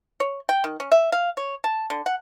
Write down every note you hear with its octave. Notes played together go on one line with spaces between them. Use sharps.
C#5
G5
D#3
C#4
E5
F5
C#5
A5
D3
F#5